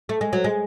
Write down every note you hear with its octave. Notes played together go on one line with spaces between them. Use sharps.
A3
G#3
F#3
G#3